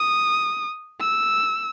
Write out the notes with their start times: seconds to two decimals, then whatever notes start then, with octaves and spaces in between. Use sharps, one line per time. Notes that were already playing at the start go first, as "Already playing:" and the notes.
Already playing: D#6
1.00 E6